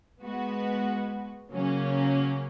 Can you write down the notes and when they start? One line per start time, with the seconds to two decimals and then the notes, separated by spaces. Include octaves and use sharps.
0.21 G#3 B3 F#4 B4
1.51 C#3 F#3 A#3 C#4